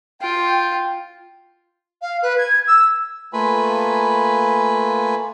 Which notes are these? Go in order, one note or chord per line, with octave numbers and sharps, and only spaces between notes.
F4 G5
F5
B4
G#6
E6
A3 A#3 F4 B4 G#5 B5